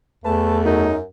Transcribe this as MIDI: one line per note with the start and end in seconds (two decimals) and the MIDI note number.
0.24 0.98 40
0.24 0.87 57
0.24 0.58 71
0.24 0.58 80
0.24 0.58 81
0.65 1.01 42
0.65 0.96 63